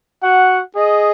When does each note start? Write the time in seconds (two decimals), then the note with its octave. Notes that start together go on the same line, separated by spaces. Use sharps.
0.23 F#4 F#5
0.75 G#4 D#5